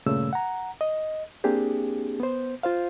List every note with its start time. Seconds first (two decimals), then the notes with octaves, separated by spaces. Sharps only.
0.06 G2 A#2 C#3 A3 E6
0.33 F#5 A#5
0.81 D#5
1.44 A#3 C4 D4 G4 G#4
2.20 B3 C5
2.63 F4 C5 F5